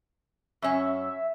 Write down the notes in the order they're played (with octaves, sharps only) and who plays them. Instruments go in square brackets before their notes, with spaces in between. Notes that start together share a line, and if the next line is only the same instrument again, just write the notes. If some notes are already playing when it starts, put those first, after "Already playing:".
[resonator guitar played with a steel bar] F#2 C#4 [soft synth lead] E5